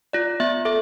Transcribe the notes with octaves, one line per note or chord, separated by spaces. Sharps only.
F4 D5
B3 E5
A4 E5